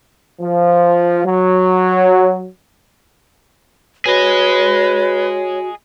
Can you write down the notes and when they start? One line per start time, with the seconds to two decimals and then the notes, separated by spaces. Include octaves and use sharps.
0.41 F3
1.25 F#3
4.06 F#4 G#4 B4 C#5 D#5